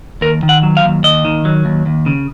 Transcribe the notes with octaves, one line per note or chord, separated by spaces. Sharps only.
D#2 A#4
D#3
F#5
F#3
F5
D#2
D#2 D#5
D#3
F#3
D#2
D#2
C#3